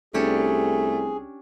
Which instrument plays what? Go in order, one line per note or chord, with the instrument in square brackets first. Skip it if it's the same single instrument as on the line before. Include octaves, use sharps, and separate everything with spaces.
[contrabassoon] C2 [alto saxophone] A3 [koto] C#4 D4 G4 [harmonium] G#4